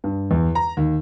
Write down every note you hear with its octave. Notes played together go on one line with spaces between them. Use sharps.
G2
E2
A#5
D#2